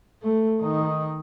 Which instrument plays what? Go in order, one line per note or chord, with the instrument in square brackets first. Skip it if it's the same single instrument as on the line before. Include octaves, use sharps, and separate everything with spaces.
[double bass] A3
D#3 D#4